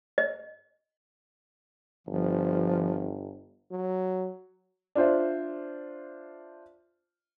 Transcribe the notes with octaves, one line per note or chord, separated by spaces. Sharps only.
D#5
G1 F3
F#3
D4 F4 C5 E5